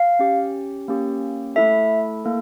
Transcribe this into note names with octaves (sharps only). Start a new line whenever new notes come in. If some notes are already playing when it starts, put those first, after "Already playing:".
Already playing: F5
C#4 G4
A#3 C#4 G4
A3 E4 A4 E5
A#3 E4 A4